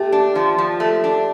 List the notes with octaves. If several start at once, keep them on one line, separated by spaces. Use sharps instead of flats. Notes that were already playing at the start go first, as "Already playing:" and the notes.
Already playing: A3 G4
D4
F3
F3
A3
D4